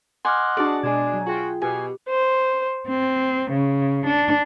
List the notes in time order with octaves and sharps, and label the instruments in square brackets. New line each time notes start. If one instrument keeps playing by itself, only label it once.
[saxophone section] D#5 F#5 [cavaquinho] G#5 [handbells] C6 D6 F6
[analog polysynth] D4 F#4 G#4 [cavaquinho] D5 A5
[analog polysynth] B2 [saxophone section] G#3 D4 [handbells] G#5 G#6
[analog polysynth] F#3
[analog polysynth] F4 G#4 G5 [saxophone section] F#4
[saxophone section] B2 [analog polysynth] G4 [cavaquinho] G#5
[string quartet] C5
C4
C#3
D4